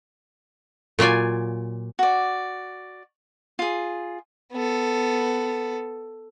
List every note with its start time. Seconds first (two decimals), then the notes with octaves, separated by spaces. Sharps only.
0.99 A#2 F#3 F4 D5 G#5
1.99 F#4 D5
3.59 F4 G#4
4.52 B3 A4